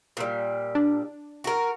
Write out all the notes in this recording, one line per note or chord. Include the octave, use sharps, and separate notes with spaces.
A#2 G3
D4
F#4 A#4